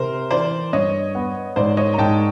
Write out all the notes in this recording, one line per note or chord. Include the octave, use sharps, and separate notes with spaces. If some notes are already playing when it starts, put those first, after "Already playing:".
Already playing: C3 A#4 C5
E3 C5 D5
G2 C#5 D#5
B3
G#2 C5 D5
C#5 D#5
A#5
G#2 G5 A5